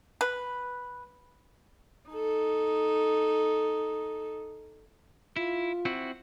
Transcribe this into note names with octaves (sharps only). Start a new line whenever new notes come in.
B4
D#4 A4
E4 F4
C4 E4 F#4